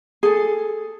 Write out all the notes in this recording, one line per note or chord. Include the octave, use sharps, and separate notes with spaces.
G#4 A4